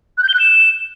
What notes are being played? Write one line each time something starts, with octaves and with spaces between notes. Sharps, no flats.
F#6
G6
G7
F#6
E7